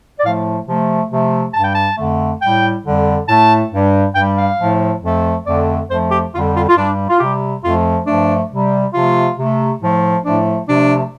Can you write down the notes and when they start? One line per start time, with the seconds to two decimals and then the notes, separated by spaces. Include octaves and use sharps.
0.19 D5
0.24 A2 F3 A3 F5
0.66 C3 F3 A3
1.10 C3 F3 A3
1.54 G2 G3 A5
1.64 G5
1.74 A5
1.97 F2 D3 A3
2.41 A2 G3 G5
2.85 F2 D3 G3
3.28 A2 A3 A5
3.71 G2 G3
4.15 G2 G3 G5
4.37 F5
4.58 A2 F3 A3
5.02 F2 F3 A3
5.46 F2 D3 A3 D5
5.89 F2 F3 A3 C5
6.11 G4
6.32 F2 D3 G3 F4
6.55 F4
6.68 F4
6.77 G2 G3 D4
7.08 F4
7.20 C3 G3 G4
7.63 F2 F3 A3 F4
8.06 G2 F3 A3 D4
8.51 C3 G3
8.94 C3 F3 A3 F4
9.38 C3 A3
9.81 A2 F3 A3
10.24 A2 F3 A3 D4
10.68 C3 F3 A3 D4